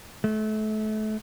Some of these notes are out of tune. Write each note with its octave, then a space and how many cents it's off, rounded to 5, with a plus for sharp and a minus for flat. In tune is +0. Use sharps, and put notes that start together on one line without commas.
A3 -30